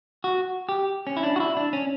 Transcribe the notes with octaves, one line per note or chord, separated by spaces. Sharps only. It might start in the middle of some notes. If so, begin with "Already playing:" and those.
F#4
G4
C#4
E4
D4
F#4
E4
D4
C#4